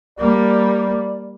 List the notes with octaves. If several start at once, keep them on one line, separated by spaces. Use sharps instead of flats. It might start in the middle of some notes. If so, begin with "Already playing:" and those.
G3 A#3 D5